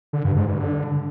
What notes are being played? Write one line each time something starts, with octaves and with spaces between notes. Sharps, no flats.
D3
G2
G#2
G2
D3